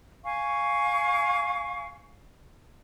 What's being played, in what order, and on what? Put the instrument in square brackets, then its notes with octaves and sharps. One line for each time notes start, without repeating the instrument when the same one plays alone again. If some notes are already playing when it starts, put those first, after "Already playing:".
[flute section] F5 G#5 C#6